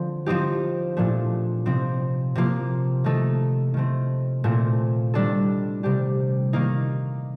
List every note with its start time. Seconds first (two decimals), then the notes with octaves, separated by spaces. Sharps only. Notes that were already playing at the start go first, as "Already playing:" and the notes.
Already playing: D3 F3 C4
0.26 F3 C4 D#4 G4
0.97 A#2 F3 A3 D4
1.66 C3 F3 C4 D#4
2.35 C3 F3 A#3
3.04 D#3 A3 D#4 A4
3.74 D#3 A3 C4
4.44 A#2 A3 C4
5.14 D#3 G3 D4 A4
5.83 C3 G3 D4 G4
6.53 D#3 A#3 D#4